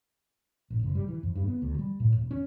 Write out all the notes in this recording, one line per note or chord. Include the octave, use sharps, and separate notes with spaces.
A1
F#1
G3
E3
F2
G2
B3
D2
G3
A2
E1
C#4